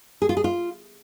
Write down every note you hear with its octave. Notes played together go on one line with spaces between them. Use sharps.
G#4
F4
G#4
F4